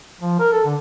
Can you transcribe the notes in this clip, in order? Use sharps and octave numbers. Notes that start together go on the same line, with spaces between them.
F3
A#4
A4
D3